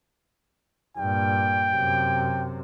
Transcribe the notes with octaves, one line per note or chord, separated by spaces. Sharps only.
G2 A#2 G5
F#2 C3